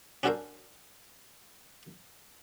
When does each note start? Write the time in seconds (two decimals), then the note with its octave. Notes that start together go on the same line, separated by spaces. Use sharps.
0.23 C#4 D4 F#4 A4 A#4 C5